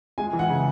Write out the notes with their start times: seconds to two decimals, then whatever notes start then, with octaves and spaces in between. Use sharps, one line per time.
0.18 G#3 G#5
0.33 E3
0.39 F#5
0.49 C#3